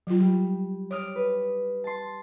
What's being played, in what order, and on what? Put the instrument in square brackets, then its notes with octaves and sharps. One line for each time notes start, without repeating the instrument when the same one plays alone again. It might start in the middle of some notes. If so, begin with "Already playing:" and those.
[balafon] F#3 F4
[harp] G3
[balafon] C#5 [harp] D6 D#6 F6
[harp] B4
A5 C6